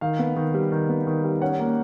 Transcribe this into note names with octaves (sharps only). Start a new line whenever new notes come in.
D#3 F5
B3
D#3
G3
D#3
B3
D#3
G3
C#4 F#5
A#3